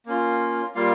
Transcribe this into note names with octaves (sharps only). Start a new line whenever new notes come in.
A#3 C#4 F4
G3 A#3 F4 F5